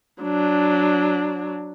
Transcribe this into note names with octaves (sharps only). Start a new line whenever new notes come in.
F#3 D4